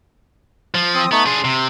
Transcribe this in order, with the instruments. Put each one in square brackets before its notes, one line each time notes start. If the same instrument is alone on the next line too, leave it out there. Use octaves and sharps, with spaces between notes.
[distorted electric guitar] F3
[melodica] C4 D#6
[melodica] A3 D#4 [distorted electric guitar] B3
[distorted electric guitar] D4 G#4 [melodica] C6
[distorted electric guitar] C3